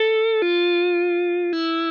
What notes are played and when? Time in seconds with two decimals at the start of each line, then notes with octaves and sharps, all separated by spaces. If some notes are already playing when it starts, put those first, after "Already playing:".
Already playing: A4
0.42 F4
1.53 E4